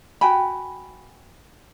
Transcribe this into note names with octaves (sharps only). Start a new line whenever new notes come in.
F#4 G5 G#5 B5